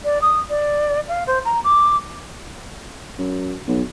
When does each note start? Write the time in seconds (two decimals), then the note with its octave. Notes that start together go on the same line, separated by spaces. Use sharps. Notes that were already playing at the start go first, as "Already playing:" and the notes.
0.05 D5
0.22 D#6
0.50 D5
1.08 F5
1.27 C5
1.45 A#5
1.64 D6
3.19 F#2
3.68 B1